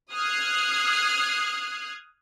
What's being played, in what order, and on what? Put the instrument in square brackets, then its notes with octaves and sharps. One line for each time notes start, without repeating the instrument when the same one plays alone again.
[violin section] D#6 F6 F#6 G#6 C7